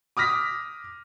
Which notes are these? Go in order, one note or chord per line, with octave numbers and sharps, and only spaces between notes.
D6 D#6 F6 A#6 B6